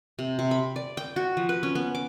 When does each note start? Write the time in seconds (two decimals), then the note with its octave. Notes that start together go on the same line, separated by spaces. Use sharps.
0.19 C3
0.39 C3
0.51 B5
0.76 D5
0.97 G5
1.16 F#4
1.37 F3
1.49 B4
1.63 C#4
1.75 B3
1.95 D6